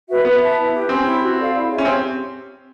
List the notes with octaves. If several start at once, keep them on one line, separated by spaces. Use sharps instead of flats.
F#4 B4 E5
B3 B4
E5 A5
E4
G4 B4
C4 C#4
E4 G4
F#4
A4 D5 F5
E4
G#4 C#5 E5
C#4
C4 G4